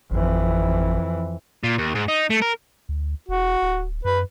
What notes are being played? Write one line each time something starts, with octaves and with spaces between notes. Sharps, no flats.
G#1 F2 E3
A#2
D#2
G#2
D#4
A3
A#4
D2
E1 F#4
D1
F#2 B4